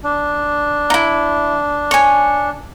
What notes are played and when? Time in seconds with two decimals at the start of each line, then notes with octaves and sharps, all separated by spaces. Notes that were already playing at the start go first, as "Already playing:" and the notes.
0.04 D4
0.90 D#4 E4
1.91 C#5 G#5